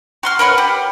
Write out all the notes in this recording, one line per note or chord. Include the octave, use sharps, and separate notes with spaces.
F#4 C6 F6
A#4 B4 C#5 F#5
G4